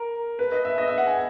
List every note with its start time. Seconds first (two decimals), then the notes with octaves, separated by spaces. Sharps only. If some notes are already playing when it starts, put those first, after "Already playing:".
Already playing: A#4
0.39 B4
0.52 D#5
0.65 E5
0.78 D#5
0.88 E5
0.98 F#5
1.07 G#5